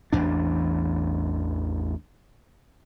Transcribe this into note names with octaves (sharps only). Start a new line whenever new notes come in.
A1 E2 D4